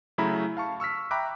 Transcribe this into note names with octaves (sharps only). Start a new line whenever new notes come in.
C#3 F#3 A3 E4 A#5 B5
F5 A5 C#6
C#6 E6 F6 B6
E5 G5 A#5 B5 D6 F#6